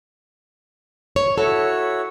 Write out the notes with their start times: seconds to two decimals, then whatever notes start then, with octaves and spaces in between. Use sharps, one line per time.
1.16 C#5
1.38 E4 F#4 A4 C#5